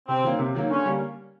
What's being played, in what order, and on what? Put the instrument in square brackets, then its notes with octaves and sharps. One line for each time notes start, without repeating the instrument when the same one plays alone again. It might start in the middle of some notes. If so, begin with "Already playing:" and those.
[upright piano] C3 [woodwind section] C4
[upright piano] D#3 F#3 A#3
C3
D#3 F#3 A#3
[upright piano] D3 [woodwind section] C#4
[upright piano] G3 A#3